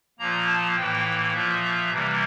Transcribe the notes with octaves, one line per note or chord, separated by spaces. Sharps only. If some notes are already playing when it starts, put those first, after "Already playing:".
A#2 F3 A#3 A#5
A5
A2 E3 A#3 G5
A#2 F3 A#3 E5
C3 E3 G3 A#3